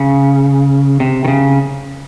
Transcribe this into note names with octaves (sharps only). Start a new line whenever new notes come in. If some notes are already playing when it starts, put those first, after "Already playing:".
Already playing: C#3
C3
D#3
C#3